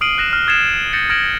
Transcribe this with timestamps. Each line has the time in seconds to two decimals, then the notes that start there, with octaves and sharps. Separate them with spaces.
0.01 D#6 F6 C7 D7 D#7 F#7
0.18 F#6 A#6 E7
0.33 F6
0.48 D#6 G#6 A6 C7 C#7 E7
0.93 G6 A6 A#6 C#7 E7
1.10 F6 G#6 A#6 D7 E7 F#7